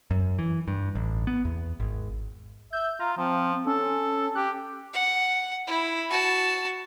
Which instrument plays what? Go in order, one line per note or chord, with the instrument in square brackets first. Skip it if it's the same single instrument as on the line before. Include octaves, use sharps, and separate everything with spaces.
[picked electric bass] F#2
E3
G2
A1
B3
E2
G#1
[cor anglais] E5 [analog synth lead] G6
[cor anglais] F4 [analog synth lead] A#5
[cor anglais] F3 [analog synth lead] C4
[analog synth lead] C#4 [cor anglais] A4
[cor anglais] G4 [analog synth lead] F#6
[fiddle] F#5
E4
F#4 A5